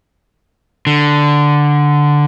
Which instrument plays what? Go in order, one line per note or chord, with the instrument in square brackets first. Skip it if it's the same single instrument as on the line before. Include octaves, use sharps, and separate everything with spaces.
[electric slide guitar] D3